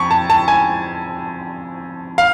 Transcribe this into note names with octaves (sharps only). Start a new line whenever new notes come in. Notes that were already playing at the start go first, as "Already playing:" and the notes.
Already playing: F2 C#6
A5
A5
G#5
F5